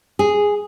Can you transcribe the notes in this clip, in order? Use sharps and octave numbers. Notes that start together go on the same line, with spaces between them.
G#4